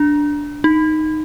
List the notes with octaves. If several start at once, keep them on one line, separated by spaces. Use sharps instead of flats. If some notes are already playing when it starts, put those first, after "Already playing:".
Already playing: D4
D#4